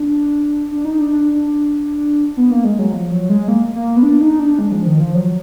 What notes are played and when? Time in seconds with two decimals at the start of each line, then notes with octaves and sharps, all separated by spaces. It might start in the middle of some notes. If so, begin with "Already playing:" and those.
Already playing: D4
0.71 D4
0.85 D#4
0.99 D4
1.12 D4
2.37 B3
2.50 A#3
2.64 G#3
2.79 F#3
2.92 F3
3.11 F#3
3.29 G#3
3.48 A#3
3.75 A#3
3.96 B3
4.03 D4
4.21 D#4
4.39 D4
4.59 G#3
4.72 F3
4.86 D#3
5.00 F3
5.14 F#3